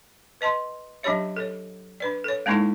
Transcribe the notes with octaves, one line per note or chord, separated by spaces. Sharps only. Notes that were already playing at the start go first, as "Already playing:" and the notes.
B4 D#5 A5 C6
F#3 C#4 D4 G4 C#5 E5
A4 C#5
D4 B4 D5
A4 C#5
G#3 A#3 C#4 D#4 E4 A4